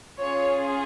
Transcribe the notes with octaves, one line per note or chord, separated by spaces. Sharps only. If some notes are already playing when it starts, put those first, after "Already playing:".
C#4 F4 G#4 C#5